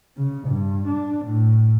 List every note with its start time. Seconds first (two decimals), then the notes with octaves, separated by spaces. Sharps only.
0.17 C#3
0.48 G2
0.87 D4
1.25 A2